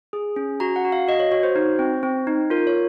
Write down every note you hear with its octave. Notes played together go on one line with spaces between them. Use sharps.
G#4
C#4
F#4 A#5
F#5
F#4
F5
F#4 D#5
C#5
F#4 C#5
C5
D#4
C4
C4
D#4
F4 A#4
C#5